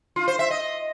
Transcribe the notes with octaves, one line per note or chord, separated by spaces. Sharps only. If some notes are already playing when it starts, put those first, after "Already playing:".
F4
C5
E5
D#5